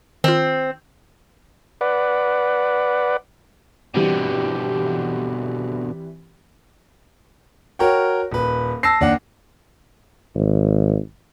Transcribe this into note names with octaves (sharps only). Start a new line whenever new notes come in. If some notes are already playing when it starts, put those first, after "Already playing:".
D#3 C4 F4
B4 D5 F#5
B2 D3 E3 G3 C4 G4
F#4 A#4 C#5 G5
D#1 B4
A5 E6 A#6 C7
D#2 D4 F#5
G#1